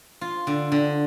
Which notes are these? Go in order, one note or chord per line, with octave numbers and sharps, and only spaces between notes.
F4
D3
D3